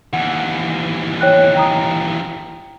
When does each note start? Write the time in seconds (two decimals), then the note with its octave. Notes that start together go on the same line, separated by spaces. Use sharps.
0.13 D#2 E3 F#5
1.21 C#5 G5 F#6
1.55 G5 A#5 D#6